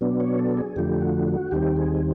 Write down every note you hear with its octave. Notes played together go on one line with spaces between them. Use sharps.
B2 F#3 B3 D4
C#5
A4
G#4
F2 D3 F3 A3 G4
F#4
F#4
D#2 D#3 G3 C4 G4
G#4